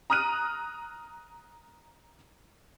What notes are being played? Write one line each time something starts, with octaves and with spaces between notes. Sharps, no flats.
A#5 D#6 F6 F#6 D#7